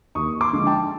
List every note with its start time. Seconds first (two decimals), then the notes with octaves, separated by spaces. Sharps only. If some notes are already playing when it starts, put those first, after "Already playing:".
0.15 D#2 C#6 D#6
0.41 C6 D6
0.53 D3 F3 G#3
0.67 G5 A5